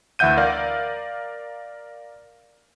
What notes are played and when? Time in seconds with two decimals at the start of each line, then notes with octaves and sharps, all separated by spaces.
0.19 D2 E3 E5 F#5 G6 D#7
0.37 A#4 D5 F5